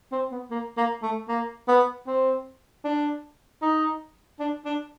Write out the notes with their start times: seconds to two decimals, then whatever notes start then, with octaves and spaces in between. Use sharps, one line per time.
0.12 C4
0.31 B3
0.51 A#3
0.77 A#3
1.02 A3
1.28 A#3
1.68 B3
2.07 C4
2.84 D4
3.62 D#4
4.39 D4
4.65 D4